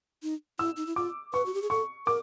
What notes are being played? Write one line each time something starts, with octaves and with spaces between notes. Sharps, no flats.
D#4
E4 E6
D#4
E4
F4 D6
B4 C#6
F#4
G4
G#4
A4 C#6
A#4 D6